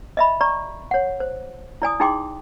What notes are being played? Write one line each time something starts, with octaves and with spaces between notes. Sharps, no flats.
D#5 E5 B5
D5 A#5 C#6
C#5 F#5
C5
E4 D5 G#5 D#6
D#4 E4 G#4 G5 C6 D6